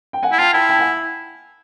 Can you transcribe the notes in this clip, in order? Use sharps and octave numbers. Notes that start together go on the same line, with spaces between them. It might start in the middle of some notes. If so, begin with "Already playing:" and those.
G5
F#5 G#5
E4
F4 G5 A5
E4 G5 A5
G5 A5
F#5 G#5